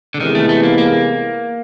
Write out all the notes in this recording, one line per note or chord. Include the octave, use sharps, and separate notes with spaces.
D3
C3 D#3 E3 G#3 B3 E4
A3
A3
A#3
A#3